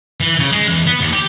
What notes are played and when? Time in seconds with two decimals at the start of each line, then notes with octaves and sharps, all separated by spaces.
0.20 E3
0.39 C#3
0.52 G#3
0.68 E2
0.86 B3
1.01 D#2
1.13 G4